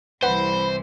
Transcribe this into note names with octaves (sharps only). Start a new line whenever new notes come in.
C2 E3 B4 C5 F#5 B5